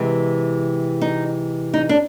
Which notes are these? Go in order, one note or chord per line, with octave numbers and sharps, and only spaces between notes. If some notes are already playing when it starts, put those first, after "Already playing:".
Already playing: C3 E3 G#3 C4
D#4
D#4
D4